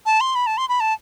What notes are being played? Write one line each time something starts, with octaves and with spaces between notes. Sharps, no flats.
A5
C6
B5
A5
C6
B5
A5